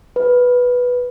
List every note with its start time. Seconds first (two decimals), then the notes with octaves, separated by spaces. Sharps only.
0.16 B4